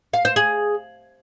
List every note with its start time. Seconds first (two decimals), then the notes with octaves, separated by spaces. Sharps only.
0.13 F5
0.25 C5
0.36 G#4